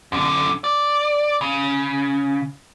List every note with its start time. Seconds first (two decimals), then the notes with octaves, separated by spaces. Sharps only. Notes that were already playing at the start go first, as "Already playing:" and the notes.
0.12 F#2 D3
0.64 D5
1.41 C#3